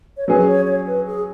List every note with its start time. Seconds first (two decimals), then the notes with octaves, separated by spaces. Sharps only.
0.17 C#5
0.28 F#3 C#4 G#4 B4
0.47 C#5
0.67 C#5
0.87 B4
1.07 G#4